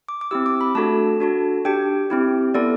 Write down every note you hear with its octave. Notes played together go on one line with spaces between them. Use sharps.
D6
D6
C4 E4 G4 E6
D6
B5
A3 D4 F#4 A4 A5
D4 F#4 A4
D4 G4 G5
C4 E4 G4
B3 E4 A4 D5